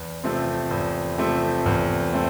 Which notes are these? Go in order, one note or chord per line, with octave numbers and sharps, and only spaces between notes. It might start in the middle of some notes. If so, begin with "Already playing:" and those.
Already playing: E2
C3 F3 A3 C4
E2
C3 F3 A3 C4
E2
A3 C4